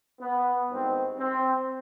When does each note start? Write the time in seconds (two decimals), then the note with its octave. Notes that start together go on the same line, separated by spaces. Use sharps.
0.21 B3
0.69 G#1 G2 D#3 C4
1.19 C4